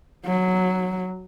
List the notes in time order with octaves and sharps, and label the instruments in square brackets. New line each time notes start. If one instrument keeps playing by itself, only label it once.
[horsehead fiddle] F#3